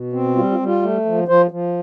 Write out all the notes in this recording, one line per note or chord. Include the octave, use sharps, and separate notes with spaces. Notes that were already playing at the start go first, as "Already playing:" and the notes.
Already playing: B2
C4
G3 F4
F4
G3
F4
A3
F3
F3 C5
F3